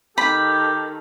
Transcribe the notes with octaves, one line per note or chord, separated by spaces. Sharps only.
D#3 G4 A4 B5